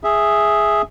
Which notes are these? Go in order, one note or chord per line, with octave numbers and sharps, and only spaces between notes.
G#4 E5